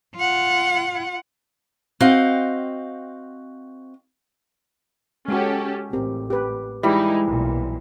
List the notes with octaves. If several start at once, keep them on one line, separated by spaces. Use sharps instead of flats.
F4 F#5
C4 F#4 D#5 F5 G5
G#3 C#4 F#4 G4 A4
A1 C4 G4 A#4
G4 B4
E3 G3 G#3 D#4 E4
B1 A#2